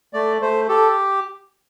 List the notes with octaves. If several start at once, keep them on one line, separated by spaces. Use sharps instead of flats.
A3 D5
A3 C5
G4 A4